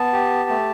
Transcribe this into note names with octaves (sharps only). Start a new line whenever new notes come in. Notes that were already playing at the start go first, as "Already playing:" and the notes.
Already playing: B3 A5
G4
A3